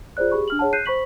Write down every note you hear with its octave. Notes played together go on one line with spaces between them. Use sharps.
F4 G#4 C5 D5 F#6
G4 G#4 B5 C#6
D4 F6 F#7
G#4 C#5 F#5 A5
F#6 G6 C7 D#7
C5 B5 C#6 B6 F#7